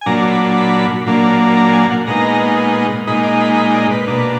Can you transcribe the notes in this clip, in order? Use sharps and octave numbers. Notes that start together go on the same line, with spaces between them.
G#5
A#2 F#3 D4 A#5
B5
B5
A#2 F#3 A#3 D4
A#5
G#5
F#5
A#2 G#3 B3 D#4 A#5
A#2 G#3 D#4 B5
D6
B5
B5
D5
B4
B2 A#3 D4